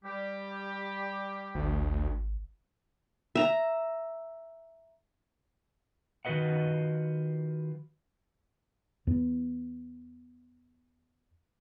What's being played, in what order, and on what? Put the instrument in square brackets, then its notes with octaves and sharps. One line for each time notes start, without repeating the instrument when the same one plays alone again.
[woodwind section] G3 G4
[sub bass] G#1 [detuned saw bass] D2
[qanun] E5 A#5
[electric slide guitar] D#3 F3 F#4 B4 D#5 F#5
[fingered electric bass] E2 B3